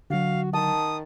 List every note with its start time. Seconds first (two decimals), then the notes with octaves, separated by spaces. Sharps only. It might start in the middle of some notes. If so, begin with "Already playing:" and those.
0.10 D3 F#3 F#4 F5
0.53 D#3 A5 D#6